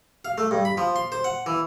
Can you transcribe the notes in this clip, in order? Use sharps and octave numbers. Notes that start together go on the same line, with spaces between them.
F5
A3
G2
B5
F3
C6
C5
F#5
E3